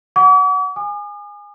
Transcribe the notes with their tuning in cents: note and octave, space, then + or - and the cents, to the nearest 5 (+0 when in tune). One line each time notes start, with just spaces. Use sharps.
F#5 +0 D6 -45
G#5 -15 D#6 -45